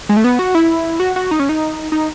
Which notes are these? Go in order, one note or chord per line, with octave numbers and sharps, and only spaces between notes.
G#3
A3
B3
F#4
E4
F#4
F#4
D#4
C#4
D#4
D#4